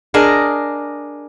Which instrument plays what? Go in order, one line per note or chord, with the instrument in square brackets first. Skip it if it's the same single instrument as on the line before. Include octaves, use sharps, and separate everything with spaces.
[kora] D4 G#4 A#4 D#5